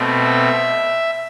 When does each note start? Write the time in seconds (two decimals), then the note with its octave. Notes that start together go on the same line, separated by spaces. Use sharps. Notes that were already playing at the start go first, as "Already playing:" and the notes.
Already playing: B2 A3 C4
0.24 E5